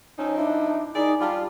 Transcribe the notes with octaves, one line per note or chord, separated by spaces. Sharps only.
F3 C4 C#4 D#4
D4 E4
D#3 D#4 E4 G#4 D5
G3 F4 A5